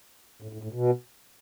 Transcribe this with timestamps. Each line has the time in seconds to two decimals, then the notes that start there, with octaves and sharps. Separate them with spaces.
0.42 A2
0.53 A2
0.63 A2
0.72 B2